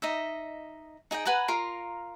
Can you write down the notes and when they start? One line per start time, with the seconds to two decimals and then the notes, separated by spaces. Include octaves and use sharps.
0.02 D#4 D#5 E5
1.11 D#4 G#4 D#5 G5
1.25 B4 F#5 G#5 A#5
1.48 F4 A#4 A#5 C6